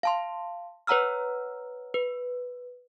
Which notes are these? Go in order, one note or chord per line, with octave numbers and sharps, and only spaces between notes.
F5 A5 C6
B4 C#5 F#5 A#5 E6 F6
B4